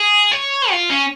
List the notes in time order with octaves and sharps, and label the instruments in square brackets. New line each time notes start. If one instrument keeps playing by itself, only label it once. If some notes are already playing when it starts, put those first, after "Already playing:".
Already playing: [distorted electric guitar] G#4
C#5
F4
C#4